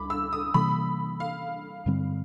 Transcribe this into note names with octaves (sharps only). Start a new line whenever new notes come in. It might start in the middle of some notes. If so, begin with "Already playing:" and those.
Already playing: C#2 B5 D6
E6
D#6
C3 E3 G3 A#3 B5
F5
G2 D3 G3 C4